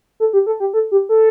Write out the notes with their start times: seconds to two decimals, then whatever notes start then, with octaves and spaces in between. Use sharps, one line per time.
0.20 A4
0.33 G4
0.46 A4
0.60 G4
0.74 A4
0.92 G4
1.09 A4